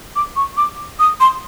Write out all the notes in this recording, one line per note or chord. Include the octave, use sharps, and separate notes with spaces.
D6
C#6
D6
D#6
C6